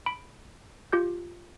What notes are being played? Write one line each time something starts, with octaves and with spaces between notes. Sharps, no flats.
B5 D7
F4 G4 G6